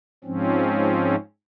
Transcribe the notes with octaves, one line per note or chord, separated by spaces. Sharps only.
G#2 F3 C4 C#4